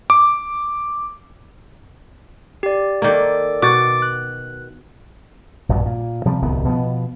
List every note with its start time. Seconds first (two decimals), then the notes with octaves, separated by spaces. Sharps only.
0.10 D6
2.63 G4 D5
3.02 D#3 A#3 A4 D5 D6
3.62 B2 F#4 D6 A6
4.02 F#6
5.69 A#1 G2 B2
5.86 A#2
6.25 C3 F3 G3
6.42 D1 C2 D#3 B3
6.65 B2 F3 B3